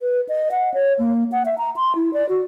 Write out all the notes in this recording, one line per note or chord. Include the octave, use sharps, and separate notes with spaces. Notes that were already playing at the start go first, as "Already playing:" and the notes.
B4
D#5
F#5
C#5
A#3
F#5
E5
A#5
C6
E4
D5
F#4